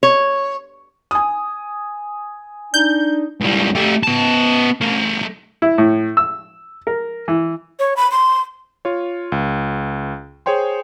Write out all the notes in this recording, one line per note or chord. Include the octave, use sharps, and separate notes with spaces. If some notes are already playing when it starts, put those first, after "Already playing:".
C#5
G#5 D#6
D4 D#4 G6
C#2 G3
A3 G4
B3 A5
A3 A#4
E4
A2
E6
A#4
E3
C#5
B5
C6
F4 C#5
C#2
G#4 C5 C#5 G5 C6